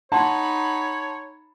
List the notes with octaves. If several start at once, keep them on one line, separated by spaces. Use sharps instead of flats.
D#4 C#5 F#5 A5 B5 C6